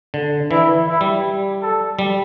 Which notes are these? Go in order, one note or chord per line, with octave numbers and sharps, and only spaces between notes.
D3
E3 E4
E4
G3
A4
G3